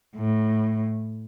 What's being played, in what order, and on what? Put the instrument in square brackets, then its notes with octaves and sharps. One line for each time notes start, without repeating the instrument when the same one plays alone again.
[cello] A2